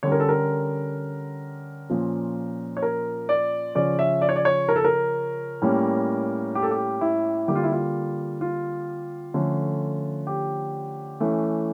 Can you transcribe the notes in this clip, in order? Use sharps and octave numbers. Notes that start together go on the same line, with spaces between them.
D3 G3 C#4 C#5
A#4
A4
A#4
A#2 F3 C#4
C#5
A#4
D5
C#3 F3 C#4 D5
E5
D5
C#5
D5
C#5
A#4
A4
A#4
A2 G3 A#3 C#4
G4
A4
G4
E4
D3 G3 A#3 G4
F4
E4
F4
F4
D3 F3 A3 C#4
G4
E3 A3 C#4